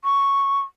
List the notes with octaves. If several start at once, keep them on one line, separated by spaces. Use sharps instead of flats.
C#6